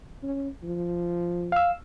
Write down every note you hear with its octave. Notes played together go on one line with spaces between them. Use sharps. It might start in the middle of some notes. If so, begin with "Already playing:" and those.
C#4
F3
F5 E6